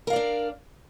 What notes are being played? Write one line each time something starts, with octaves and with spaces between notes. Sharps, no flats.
D4 A#4 D5 F5